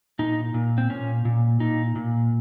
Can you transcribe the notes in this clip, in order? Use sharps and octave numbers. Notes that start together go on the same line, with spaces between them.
A#2 D#4
A#2
C4
A#2 C#4
A#2
A#2 D#4
A#2